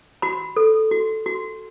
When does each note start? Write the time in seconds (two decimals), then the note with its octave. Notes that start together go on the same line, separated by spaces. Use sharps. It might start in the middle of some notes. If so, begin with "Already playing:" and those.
0.22 F#4 B5
0.56 A4
0.91 F#4
1.26 F#4